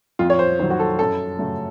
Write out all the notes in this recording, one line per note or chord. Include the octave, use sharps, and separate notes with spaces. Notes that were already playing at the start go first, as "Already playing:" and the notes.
F2 F4
C#5
C5
D#3 F#3 C5
F#4
A4
F#2 A4
C#3 F#3 A3